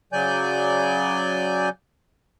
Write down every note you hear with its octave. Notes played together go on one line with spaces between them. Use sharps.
C#3 F#3 D5 G#5 G6